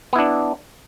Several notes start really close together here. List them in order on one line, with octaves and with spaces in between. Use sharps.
B3 E4 D4